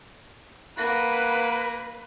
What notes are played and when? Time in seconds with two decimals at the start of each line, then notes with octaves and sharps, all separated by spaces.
0.77 A#3 B4 F#5